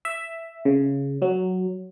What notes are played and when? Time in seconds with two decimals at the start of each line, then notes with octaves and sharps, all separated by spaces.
0.05 E5
0.65 C#3
1.22 F#3